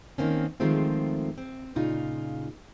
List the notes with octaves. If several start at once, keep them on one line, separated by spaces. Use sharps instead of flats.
D#3 A#3 C4 C#4
D#3 F3 G#3 A3 C4 F4
C4
A#2 C#3 D#4 F4